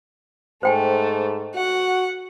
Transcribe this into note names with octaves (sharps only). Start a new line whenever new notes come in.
G#2 A3 C5 G5 G#5
F#4 F#5